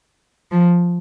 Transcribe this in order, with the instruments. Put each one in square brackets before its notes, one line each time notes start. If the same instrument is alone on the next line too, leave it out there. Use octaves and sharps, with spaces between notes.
[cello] F3